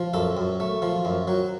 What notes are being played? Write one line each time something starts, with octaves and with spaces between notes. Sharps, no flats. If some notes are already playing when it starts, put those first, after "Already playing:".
Already playing: F3
F#2 A4
F#2
A3
F3
F#2
F#3